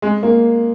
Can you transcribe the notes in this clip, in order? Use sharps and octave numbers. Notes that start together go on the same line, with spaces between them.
G#3
A#3